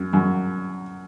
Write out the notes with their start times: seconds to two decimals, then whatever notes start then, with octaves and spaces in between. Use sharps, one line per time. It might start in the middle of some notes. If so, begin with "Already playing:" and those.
Already playing: F#2
0.13 F#2